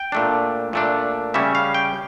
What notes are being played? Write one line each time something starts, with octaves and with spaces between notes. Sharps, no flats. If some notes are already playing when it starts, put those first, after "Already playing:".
Already playing: G5
A#2 A3 D4
A#2 A3 D4
C#3 G3 C#4 E5
F5
G5